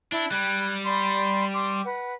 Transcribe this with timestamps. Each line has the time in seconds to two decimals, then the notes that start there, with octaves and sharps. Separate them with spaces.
0.12 D4 E4
0.32 G3 B5 F#6 G#6
0.84 D5 B5 C6
1.54 C6 D6
1.84 B4 F#5